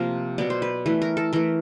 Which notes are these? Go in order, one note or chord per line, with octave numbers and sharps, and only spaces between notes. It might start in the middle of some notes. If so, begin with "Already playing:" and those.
Already playing: C3 F3 A#3
B2 F#3 B3 D5
C5
B4
E3 A3 B4
A#4
A4
E3 A3 A#4